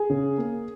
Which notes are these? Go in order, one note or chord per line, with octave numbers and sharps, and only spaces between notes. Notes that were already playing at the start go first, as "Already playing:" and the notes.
Already playing: G#4
C#3
A#3